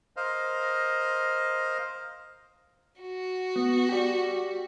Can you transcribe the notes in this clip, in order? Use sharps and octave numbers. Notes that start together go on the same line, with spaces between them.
A#4 C5 D#5 F5
F#4
B3
G4 D5